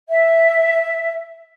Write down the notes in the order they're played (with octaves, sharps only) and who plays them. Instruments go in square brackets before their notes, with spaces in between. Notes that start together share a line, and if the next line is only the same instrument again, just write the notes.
[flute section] E5